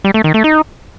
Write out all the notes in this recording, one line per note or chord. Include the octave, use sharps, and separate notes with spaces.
G3
A3
D#3
A3
D#4